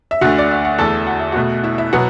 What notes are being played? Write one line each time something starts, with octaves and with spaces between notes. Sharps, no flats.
E5
D2 D3 A3 F#4 F#5
D5
E5
F#5
E2 E3 A3 A4 A5
F#5
E5
B2 A3 F#4 F#5
E4 E5
E4 E5
B2 F#3 B3 F#4 F#5